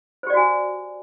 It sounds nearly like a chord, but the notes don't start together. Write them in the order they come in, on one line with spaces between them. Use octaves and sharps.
C5 G4 D5 F#4 G#5